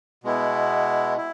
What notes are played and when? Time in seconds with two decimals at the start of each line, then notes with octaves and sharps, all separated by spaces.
0.24 B2 G#3 B3 E4
1.18 E4